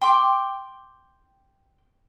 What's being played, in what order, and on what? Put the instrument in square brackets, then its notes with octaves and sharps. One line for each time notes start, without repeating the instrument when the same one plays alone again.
[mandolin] G5 C6 D6